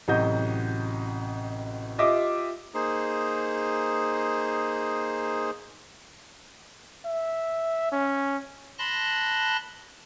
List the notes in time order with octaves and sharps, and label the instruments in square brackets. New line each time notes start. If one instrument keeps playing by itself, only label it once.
[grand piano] A1 C3 F#3 F#4 D#5 G6
F4 G4 D#5 E5 D6
[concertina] A#3 D#4 G#4 C5
[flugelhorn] E5
C#4
[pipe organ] A5 B5 C6 F#6 A#6